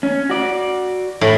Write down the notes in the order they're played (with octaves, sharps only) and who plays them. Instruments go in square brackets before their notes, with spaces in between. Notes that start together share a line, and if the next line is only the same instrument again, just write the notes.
[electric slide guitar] C#4
F#4 D5
[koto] A2